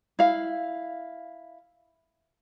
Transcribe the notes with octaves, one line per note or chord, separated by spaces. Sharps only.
E4 F5